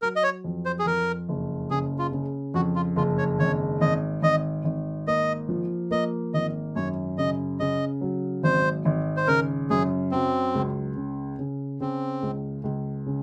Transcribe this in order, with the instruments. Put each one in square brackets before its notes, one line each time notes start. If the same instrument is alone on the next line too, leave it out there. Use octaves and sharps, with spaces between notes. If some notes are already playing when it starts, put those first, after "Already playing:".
[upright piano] F#3 [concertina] A#4
[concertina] D#5
C#5
[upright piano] F2
[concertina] C5
G#4
[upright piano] F2 [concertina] A#4
[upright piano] F#1
[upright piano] C#3 [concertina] G#4
[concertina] F4
[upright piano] C#3
[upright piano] F2 [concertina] F#4
[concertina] F4
[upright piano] F#1 [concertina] F4
[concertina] C#5
[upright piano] G#1 [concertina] C#5
[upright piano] G#1 [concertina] D#5
[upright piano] G#1 [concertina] D#5
[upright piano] G#1
[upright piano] A#3 [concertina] D#5
[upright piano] F3
[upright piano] A#3 [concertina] D#5
[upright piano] G#1 [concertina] D#5
[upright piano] F#2 [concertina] C#5
[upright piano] C#3 [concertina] D#5
[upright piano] C#3 [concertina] D#5
[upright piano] F#3
[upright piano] G#1 [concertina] C5
[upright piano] G#1
[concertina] C5
[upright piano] C#3 [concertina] A#4
[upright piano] F#2 [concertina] G#4
[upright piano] F#3 [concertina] C4
[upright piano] C#2
C#3
C#3
[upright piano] C#3 [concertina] C4
[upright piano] C#2
C#2
C#3